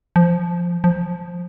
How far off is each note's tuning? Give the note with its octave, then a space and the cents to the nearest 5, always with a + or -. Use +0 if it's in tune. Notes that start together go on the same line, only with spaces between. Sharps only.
F3 -5
F3 +10